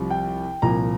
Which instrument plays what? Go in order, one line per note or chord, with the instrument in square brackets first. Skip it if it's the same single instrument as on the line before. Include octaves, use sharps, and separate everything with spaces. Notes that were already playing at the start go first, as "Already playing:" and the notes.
Already playing: [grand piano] C2 C3 F3
G5
C2 A#2 F3 A#5